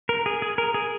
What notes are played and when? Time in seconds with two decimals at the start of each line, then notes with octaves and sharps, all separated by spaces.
0.09 A#4
0.26 G#4
0.42 G#4
0.58 A#4
0.74 G#4